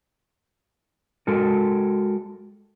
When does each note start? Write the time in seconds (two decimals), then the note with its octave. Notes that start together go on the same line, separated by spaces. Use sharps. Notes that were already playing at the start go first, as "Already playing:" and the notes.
1.27 G#3 F#4 A4 A#4